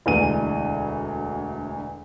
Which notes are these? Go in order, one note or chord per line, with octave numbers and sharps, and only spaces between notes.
E1 D2 E3 D#7